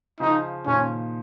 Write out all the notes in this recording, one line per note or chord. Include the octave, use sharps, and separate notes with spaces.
C#3 F3 D#4
A#2 D#3 C#4